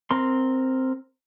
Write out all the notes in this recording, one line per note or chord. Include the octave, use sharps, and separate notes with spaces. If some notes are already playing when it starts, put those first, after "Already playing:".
C4 A#4 C6